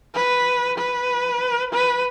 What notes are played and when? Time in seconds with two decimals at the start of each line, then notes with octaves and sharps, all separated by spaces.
0.14 B4
0.78 B4
1.73 B4